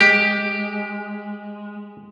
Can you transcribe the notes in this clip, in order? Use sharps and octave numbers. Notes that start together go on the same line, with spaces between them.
G#3 G4